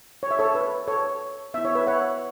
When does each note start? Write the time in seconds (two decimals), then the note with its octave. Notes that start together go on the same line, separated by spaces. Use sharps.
0.23 C#5
0.31 E5
0.39 A4 C#5
0.55 B4
0.88 A4 C#5
1.54 B3 E4 E5
1.65 C#5
1.75 B4 E5
1.87 C#5 F#5